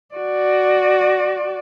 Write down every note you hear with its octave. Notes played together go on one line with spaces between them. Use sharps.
F#4 D5